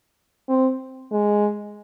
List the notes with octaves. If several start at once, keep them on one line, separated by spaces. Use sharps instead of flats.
C4
G#3